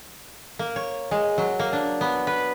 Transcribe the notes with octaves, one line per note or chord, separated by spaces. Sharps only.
A#3
C#5
G#3
F#3
A#3
D4
B3
B4